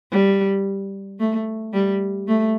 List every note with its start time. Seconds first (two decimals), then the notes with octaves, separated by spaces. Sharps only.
0.12 G3
1.20 A3
1.73 G3
2.28 A3